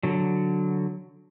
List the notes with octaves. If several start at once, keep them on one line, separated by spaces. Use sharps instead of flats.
D3 F#3